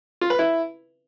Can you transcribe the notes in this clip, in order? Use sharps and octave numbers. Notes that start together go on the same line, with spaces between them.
F4
B4
E4